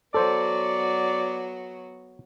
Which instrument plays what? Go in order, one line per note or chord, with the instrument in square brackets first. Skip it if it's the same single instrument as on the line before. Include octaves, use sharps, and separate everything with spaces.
[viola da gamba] F#3 B3 F#4 [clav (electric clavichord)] A4 C5 [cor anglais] D5